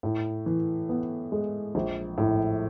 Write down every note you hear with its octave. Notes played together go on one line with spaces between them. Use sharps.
A2
E3
B3
G#3
A#1
A2